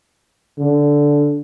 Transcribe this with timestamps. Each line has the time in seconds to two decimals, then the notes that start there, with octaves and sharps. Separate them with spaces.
0.58 D3